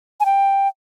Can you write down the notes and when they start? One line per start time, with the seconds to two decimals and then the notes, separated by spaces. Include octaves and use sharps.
0.20 G#5
0.25 G5